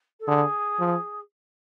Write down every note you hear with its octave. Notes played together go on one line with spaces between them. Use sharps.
A4
D3 G#4
F3